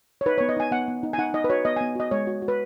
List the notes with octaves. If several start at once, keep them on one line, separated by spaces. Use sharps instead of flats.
C#5
D#4 B4
C#5
B3
D#5
D#4 G#5
B3 F#5
B3
D#4
G#5
D#4 F#5
D#4 D#5
B4
F#4 C#5
B3 D#5
G#5
B3
F#4 D#5
G#3 C#5
F#4
F#4
B4